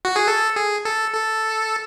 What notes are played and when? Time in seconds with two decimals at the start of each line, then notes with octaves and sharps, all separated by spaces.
0.05 F#4
0.16 G#4
0.28 A4
0.56 G#4
0.85 A4
1.15 A4